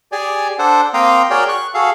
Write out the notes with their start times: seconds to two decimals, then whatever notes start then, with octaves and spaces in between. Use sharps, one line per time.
0.12 G4 G#4 D5 G#5
0.59 D4 A4 C5 F#5
0.94 A#3 C4 F5 G5 A#5 D#6
1.30 F#4 G#4 A#4 C#5 D5 G5
1.49 C#6 F#6
1.74 F#4 G#4 A4 F5